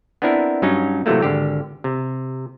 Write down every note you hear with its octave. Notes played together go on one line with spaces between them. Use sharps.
B3 C4 D4 E4 A#4
G2 F#3 C#4 D#4
A2 C3 E3 F#3 A3 A#3
G#1 D3 G4
C3